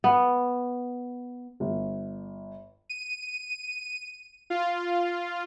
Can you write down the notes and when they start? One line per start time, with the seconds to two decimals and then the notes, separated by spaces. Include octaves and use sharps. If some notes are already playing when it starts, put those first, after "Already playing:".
0.04 B3
1.60 G1
2.89 D#7
4.50 F4